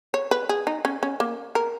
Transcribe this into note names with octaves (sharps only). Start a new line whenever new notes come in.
C#5
B4
G#4
D#4
C#4
C#4
A#3
A#4